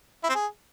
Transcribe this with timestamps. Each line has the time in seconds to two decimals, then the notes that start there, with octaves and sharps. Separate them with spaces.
0.24 E4
0.29 C4
0.35 G#4